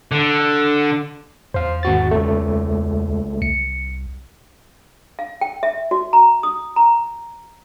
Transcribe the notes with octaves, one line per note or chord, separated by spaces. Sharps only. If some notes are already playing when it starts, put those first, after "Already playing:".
D3
E2 C5 F5
G#1 F#4 A6
C#2 A3
C2 C#7
F5
G5
E5
F#4
A#5
D#6
A#5